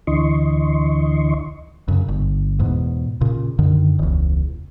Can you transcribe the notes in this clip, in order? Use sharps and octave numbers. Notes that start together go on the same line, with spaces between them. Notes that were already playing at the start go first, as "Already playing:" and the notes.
D2 D3 E3 D#5 C6 C#6
F#2 C#3
G1
E2 G#2 B2
A#2 C#3
F#2 D3 D#3
E1 C#2